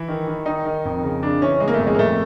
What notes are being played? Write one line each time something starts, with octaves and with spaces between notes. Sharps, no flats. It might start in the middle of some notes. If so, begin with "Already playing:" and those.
Already playing: E3 E4
D#3
D#3
D#3 D#4
D#3
F2
C#3
C#3 D4
E3 C#4
C#3 G#3
A#3
A3
F2
G#3
A#3
F2 A3